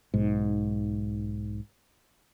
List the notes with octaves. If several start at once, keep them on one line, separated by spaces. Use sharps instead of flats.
B1 G#2